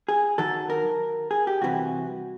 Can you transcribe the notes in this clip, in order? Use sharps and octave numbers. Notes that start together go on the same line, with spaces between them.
G#4
F#2 D#3 F#3 A4
A#4
G#4
G4
C2 C3 E3 F#4